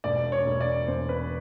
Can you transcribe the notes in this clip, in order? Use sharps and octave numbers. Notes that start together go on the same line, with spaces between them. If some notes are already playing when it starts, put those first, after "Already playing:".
E1 D5
C#5
E1
D5
E2 C5
B4